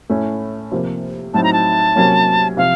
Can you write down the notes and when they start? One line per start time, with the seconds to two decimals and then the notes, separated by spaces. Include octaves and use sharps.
0.10 A2 A3 C#4
0.72 C3 F3 A#3
1.34 A2 F#3 C4 D#4 A5
1.44 A#5
1.53 A5
1.96 C3 F#3 A#3 C#4
2.57 C3 F3 F5